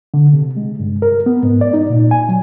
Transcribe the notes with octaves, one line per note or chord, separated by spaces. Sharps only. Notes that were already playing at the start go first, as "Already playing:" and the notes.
D3
C3
G#3
G2
A#4
B3
G#2
D5
D#4
A#2
G#5
F#3